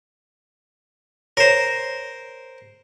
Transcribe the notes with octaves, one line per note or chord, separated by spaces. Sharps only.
A#4 C5 C#5